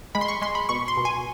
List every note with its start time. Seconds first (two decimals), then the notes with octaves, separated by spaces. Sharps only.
0.15 G#3 B5
0.21 C6
0.28 C#6
0.42 G#3 C6
0.55 B5
0.69 B2 C#6
0.88 C6
0.97 B2
1.05 G#5